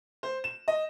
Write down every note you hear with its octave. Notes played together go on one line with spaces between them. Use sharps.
C5
E7
D#5